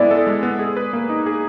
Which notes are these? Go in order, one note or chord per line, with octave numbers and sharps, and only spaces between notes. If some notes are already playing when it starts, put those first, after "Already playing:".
Already playing: G#3 B3 E4 A4 D5
A4
G#3
B3
G#4
B4
A#3
D#4
G#4